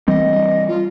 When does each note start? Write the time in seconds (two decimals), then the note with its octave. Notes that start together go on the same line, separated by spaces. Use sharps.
0.08 E3 G3 C4 D#5
0.67 F4